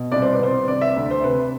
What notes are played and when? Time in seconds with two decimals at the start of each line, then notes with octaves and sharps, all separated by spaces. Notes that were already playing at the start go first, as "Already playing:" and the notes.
Already playing: B2
0.12 C2 D5
0.22 C5
0.33 B4
0.39 C2 C5
0.68 C3 D5
0.81 E5
0.96 D2
1.11 C5
1.24 C3 B4